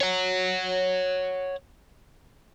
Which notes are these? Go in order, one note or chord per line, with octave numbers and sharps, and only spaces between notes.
C#5 F#5